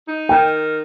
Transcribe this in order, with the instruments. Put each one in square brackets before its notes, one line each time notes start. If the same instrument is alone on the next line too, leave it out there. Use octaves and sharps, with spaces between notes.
[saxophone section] D#4
[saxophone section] D#3 [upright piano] G5